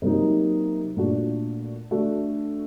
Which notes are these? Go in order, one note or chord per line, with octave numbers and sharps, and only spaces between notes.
C3 F#3 A#3 D#4
A#2 A3 D4 F#4
D3 A3 D4 F#4